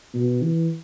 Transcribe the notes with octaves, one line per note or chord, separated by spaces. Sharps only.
B2
E3